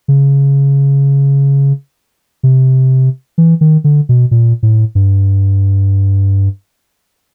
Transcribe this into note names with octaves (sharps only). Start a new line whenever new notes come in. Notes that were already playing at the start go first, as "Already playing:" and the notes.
C#3
C3
E3
D#3
D3
B2
A#2
A2
G2